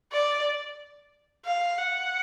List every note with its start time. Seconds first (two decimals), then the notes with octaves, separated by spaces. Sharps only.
0.12 D5
1.45 F5
1.78 F#5